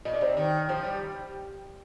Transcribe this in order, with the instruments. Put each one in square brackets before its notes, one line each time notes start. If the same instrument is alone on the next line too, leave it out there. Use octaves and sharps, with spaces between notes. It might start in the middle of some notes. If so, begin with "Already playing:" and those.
[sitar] A#2 [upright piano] D#5
[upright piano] D5
[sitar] C3 [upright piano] C5
[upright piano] D5
[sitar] D#3
[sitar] F3 [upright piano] C5
[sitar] G3